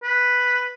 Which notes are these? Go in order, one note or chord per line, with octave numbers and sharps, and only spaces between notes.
B4